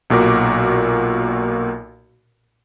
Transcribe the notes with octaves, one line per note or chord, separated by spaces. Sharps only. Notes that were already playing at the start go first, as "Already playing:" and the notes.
B1 A#2 F#4 A#4 D6